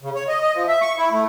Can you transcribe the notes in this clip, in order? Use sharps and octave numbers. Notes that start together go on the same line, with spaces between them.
C#3
C#5
D#5
D#5
F3
E5
C#6
E4
A3